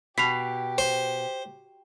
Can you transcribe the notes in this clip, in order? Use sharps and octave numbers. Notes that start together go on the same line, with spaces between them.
B2 G4 B6 C7 F7
C5